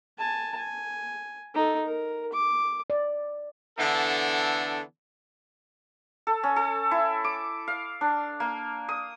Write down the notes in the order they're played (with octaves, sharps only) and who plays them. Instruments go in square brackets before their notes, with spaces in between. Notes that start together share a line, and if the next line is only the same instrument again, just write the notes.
[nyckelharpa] G#5 A5
G#5
D#4 A4
A#4
D6
[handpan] D5
[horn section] D3 E3 B3 D4 A4
[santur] A4
C#4
A4
E4
D6
F5
D4
A#3
D#6